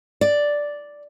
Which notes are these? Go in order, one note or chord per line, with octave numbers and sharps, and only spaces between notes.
D5